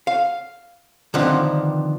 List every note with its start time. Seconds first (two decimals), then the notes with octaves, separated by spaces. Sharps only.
0.07 F5
1.14 D3 D#3 F3 B3 C4 D4